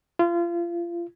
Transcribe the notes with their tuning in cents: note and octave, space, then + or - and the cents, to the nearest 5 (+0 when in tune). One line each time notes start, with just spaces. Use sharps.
F4 -30